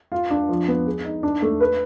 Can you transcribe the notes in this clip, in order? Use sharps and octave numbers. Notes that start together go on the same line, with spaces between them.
F4
D4
F3
B3
G#4
D#4
D4
A3
B4